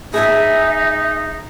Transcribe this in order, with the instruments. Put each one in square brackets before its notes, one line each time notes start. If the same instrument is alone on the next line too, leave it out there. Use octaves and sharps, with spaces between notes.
[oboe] D#4 [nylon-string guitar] G#4 G#5 [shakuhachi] E5